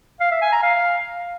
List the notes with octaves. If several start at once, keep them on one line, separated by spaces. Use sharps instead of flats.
F5
E5
G#5
A#5
F5